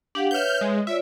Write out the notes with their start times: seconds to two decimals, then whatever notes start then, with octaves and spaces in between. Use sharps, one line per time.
0.15 D4 G4 F5 F#5
0.31 B4 C#5 E5 F6 G6
0.61 G#3
0.87 F4 C#5 D5 E5